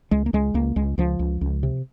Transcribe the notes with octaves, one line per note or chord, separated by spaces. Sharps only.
C#2 G#3
A#3
C#2 G#3
C#2 A#3
C#2 G#3
C#2 F3
C#2
C#2
C3